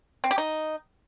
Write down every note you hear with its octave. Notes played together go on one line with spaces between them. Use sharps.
C4
G4
D#4